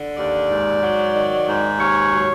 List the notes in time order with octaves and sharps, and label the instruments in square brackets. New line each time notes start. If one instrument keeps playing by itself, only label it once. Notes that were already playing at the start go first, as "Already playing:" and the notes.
Already playing: [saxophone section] D3
D#2 D5
G#2
F#3
D#3
G#2
D#2 C#5
F#3